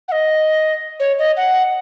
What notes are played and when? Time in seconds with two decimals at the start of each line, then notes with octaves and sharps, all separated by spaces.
0.08 F#5
0.12 D#5
1.00 C#5
1.19 D#5
1.37 F#5